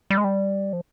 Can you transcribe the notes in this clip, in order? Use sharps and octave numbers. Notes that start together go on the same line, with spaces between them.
G3
G#3
G3
F3